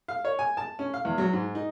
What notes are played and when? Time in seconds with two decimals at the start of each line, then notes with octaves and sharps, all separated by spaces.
0.08 F5
0.25 C#5
0.39 G#5
0.57 A5
0.79 C#4
0.94 F5
1.05 E2
1.18 F#3
1.33 G#2
1.55 D#4